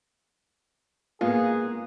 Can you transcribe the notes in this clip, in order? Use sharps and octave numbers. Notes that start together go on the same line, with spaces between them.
G#2 A#3 B3 F4 G#4